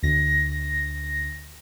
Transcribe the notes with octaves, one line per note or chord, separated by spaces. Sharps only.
D2 A#6